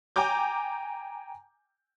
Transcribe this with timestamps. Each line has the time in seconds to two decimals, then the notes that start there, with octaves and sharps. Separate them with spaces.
0.16 G5 G#5 A#5 D6 G6